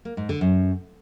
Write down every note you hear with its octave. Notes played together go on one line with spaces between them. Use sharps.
A#3
G#2
D3
F#2